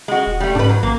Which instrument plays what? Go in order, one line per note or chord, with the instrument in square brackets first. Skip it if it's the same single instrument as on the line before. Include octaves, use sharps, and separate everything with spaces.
[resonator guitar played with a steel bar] G#3 F#4
[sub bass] E1
[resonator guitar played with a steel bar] G3 A3
[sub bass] G#2 [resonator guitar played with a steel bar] D4 B4
[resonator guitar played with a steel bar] F#3
[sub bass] A1 [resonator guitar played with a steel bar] A#3